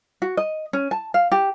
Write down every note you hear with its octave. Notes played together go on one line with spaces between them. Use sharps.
F#4
D#5
C#4
A5
F5
G4